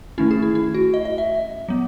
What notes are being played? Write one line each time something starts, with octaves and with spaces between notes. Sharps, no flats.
D#3 A3 C#4 E4
G#4
E4
E4
F#4
D#5
D#5
E5
F#3 B3